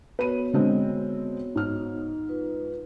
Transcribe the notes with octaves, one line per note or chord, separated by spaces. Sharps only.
B3 F#4 B4 C#5 D#7
D3 G#3 C4
G#2 F6
F4 B4